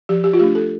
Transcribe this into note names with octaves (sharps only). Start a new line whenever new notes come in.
F3 G4
G4
F4
A3 D4 G4
A4